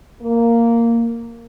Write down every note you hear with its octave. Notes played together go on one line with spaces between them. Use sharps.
A#3